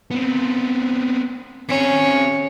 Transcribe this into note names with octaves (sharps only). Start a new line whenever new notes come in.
B3 C4
C4 C#4 G#4